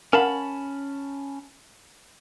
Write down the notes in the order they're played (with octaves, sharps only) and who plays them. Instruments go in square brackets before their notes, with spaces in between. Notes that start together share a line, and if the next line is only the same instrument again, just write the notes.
[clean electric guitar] C#4 A5 B5 [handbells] A#4 F5 F#5